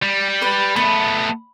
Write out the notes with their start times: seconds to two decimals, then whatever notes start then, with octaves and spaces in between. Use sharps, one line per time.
0.03 G3
0.42 B4 D5
0.76 A3 B3 B5